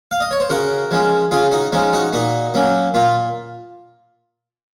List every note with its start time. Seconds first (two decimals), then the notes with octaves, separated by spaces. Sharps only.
0.11 F5
0.20 D#5
0.31 C#5
0.40 C5
0.49 C#3 F#4 A#4
0.91 F3 G#3 C#4
1.31 C#3 F4 G#4
1.51 D#4 F#4
1.72 F3 G#3 C#4 D#4
1.93 D#4 F#4
2.13 A#2 D#4 F#4
2.54 F#3 A#3 C#4
2.94 A#2 F4